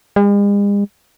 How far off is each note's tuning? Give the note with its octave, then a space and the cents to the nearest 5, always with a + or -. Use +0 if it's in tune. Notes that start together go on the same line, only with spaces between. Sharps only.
G#3 -45